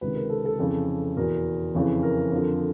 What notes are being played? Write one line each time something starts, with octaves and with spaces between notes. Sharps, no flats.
C#2 C3 D#3 B4
A#4
A4
A4
F2 C#3 E3 A4
E2 B2 A#4
F2 C#3 E3
A#4
F2 D3 F3